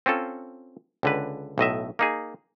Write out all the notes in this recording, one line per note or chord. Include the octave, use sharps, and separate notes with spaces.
C4 C#4 F4 A4
C#2 D3 B4
B1 A2 D#5 E5
A#3 D#4 G#4